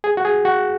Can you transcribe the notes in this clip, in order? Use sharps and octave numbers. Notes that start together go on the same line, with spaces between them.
G#4
F#4
G#4
F#4